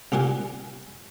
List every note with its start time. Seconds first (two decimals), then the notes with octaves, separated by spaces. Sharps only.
0.12 C2 A#2 G4 F#5 G#5